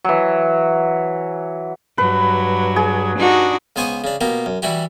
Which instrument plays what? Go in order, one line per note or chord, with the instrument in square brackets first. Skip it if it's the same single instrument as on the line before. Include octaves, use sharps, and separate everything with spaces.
[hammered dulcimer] E3 F#3
[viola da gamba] G2 F#3 [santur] B4
[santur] G#4
[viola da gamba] D4 D#4 F#4
[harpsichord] C#2 B3 C5 G#5 C#6 D#6
C#3 D4
B2 A#3 G4
F#2
E3 G3 E4 F#4 G4